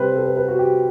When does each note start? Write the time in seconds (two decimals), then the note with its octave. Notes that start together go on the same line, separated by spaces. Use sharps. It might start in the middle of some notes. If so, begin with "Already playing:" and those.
Already playing: C3 G3 C4 B4 C5
0.16 A4
0.26 B4
0.37 B4
0.48 F#4
0.59 G4